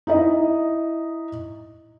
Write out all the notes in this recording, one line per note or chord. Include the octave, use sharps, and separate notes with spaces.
D#4 E4 D#5